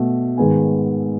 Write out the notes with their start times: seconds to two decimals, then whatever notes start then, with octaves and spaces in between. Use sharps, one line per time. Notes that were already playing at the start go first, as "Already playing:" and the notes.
Already playing: B2 A3
0.38 G#2 D#3 G#3 B3 G#5